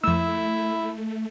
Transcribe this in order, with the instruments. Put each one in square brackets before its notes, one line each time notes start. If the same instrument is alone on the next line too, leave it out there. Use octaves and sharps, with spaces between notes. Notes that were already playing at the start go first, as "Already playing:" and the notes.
[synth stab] F2 E6 [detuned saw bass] A3 [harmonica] E4